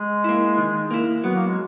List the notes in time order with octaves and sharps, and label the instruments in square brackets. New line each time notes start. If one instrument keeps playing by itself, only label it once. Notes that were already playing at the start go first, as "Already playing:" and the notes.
Already playing: [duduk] G#3
[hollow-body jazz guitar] A#3 E4
D#3
A#3 E4
[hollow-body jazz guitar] F#3 [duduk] B3
[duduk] A#3
G#3